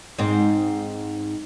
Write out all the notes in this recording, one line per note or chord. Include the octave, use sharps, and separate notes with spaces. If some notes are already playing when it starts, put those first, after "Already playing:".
G#2 C4